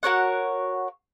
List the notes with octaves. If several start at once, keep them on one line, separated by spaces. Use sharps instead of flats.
F#4 A#4 C#5 F#5